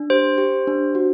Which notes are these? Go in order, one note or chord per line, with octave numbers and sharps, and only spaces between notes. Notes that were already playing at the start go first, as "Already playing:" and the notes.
Already playing: D4
G4 C5
G4
D4
F#4